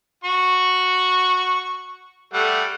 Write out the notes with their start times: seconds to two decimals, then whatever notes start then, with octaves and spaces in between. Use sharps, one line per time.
0.24 F#4 C#6
2.34 G3 A3 F#5